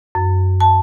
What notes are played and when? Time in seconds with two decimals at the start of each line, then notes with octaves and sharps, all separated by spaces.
0.15 F#2
0.61 A5